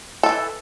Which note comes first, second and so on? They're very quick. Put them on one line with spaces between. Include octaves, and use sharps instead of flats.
A4 A3 E3